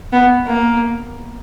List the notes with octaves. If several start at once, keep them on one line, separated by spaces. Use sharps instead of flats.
B3
A#3